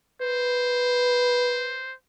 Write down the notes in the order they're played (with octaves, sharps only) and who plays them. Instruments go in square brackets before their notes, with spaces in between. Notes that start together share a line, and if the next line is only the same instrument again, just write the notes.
[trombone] B4 [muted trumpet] C5